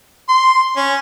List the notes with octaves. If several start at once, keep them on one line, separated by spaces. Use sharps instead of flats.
C6
C#4